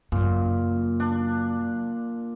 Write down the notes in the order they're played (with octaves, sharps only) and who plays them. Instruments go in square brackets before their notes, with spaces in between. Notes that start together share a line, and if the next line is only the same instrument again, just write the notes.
[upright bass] F#2 C#3 [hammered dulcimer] A#2
[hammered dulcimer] D4